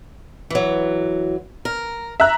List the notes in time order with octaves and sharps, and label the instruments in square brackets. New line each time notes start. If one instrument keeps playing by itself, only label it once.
[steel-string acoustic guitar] E3 F#3
A#4
[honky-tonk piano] E5 A#5 F#6